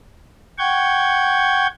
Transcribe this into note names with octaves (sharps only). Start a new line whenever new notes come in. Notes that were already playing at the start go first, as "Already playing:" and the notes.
F#5 G5 C#6 G6 G#6